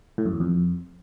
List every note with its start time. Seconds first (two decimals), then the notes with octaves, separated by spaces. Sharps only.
0.18 A2
0.25 F#2
0.33 E2
0.40 F2